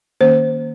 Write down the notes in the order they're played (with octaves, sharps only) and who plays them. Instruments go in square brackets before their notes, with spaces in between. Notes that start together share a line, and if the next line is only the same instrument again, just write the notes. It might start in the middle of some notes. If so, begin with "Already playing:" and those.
[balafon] D#3 A#3 C#4 C5